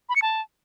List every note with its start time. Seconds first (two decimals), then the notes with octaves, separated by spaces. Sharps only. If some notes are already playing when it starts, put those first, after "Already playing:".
0.09 B5
0.16 C#7
0.22 A5